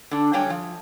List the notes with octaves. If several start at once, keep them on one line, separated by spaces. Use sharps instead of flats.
D3 D4
F#3 G3 A3 C#5 G5 G#5
F3